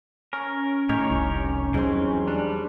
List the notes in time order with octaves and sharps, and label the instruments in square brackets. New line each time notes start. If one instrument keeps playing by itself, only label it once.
[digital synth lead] C#4 [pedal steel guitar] A#4
[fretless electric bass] A2 [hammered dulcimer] D#3 [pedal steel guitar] G4 A#4 C#5
[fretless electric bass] F1 C2
[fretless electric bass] E2 F#3 [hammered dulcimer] G#2 C6 [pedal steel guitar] E3 G3 C4
[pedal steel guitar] G3 [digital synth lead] D4